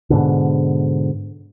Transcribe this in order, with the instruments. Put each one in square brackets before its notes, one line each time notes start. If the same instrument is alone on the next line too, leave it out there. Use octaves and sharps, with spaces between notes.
[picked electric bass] G#2 B2 D3